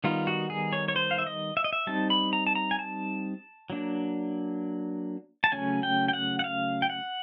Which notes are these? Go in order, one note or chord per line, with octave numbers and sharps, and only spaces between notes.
D#3 G3 B3 D#4 F4
F#4
G#4
C#5
C#5
C5
F5
E5
D#5
E5
D#5
E5
G3 C4 D#4 A5
B5
A#5
A5
A#5
G#5
A5
F#3 A#3 D4
A5
C#3 F#3 A3 C#4 G#5
G5
G5
F#5
F#5
F5
G5
F#5